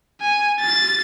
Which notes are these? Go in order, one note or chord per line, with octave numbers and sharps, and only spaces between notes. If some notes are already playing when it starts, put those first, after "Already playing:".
G#5
A6